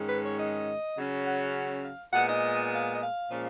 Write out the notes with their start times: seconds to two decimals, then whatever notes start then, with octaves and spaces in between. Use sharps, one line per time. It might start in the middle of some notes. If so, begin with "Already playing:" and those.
Already playing: G#2 D#3 G#3 C#4
0.09 B4
0.24 C#5
0.39 D#5
0.96 C#3 F#3 C#4
1.27 F#5
1.84 F5
2.13 A#2 G#3 B3 F#5
2.29 D#5
2.73 F5
2.95 D#5
3.02 F5
3.31 A#2 F3 G#3 C#4